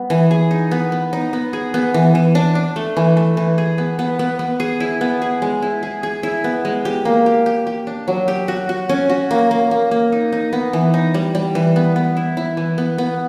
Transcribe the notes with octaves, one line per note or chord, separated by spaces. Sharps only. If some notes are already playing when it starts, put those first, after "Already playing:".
Already playing: G3 B3
E3
G#4
D#4
B3
B3
D#4
B3
G#4
B3
E3
E3
D4
D4
A3
E3
A3
E3
G#4
B3
B3
B3
B3
G#4
E4
B3
G#4
G#3
E4
G#4
G#4
E4
B3
G#3
G4
A#3
G4
G4
G4
D4
F#3
G4
F#4
F#4
C#4
F#4
A#3
A#3
A#3
A#3
D#4
D#4
B3
E3
D#4
G3
G3
E3
B3
B3
E4
E4
E3
B3
B3